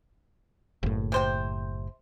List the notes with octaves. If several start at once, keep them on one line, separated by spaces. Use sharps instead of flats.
F#1 A2
C3 C5 G5